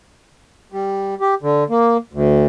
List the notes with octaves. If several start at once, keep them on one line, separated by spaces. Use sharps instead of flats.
G3
G4
D3
A#3
D2